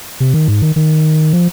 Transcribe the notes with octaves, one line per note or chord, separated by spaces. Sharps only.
C3
D#3
G#2
D#3
D#3
F3